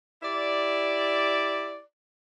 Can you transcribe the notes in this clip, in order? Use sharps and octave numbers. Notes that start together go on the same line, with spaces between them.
E4 G4 D5